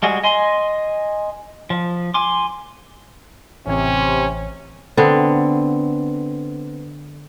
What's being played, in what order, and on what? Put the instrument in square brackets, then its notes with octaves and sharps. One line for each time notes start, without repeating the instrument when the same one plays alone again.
[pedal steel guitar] G3 G#3 F#4 G#4
D#5 G#5 C6
F3
G#5 C6 D6
[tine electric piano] A1 C#5 [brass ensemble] C3 [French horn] C#4
[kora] D3 B3 C4